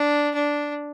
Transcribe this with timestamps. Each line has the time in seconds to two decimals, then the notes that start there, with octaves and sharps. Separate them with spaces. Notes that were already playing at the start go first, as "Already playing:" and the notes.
Already playing: D4
0.35 D4